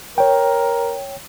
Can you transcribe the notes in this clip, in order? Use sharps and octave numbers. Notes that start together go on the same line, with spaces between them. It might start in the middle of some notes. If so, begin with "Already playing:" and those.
A#4 C#5 G5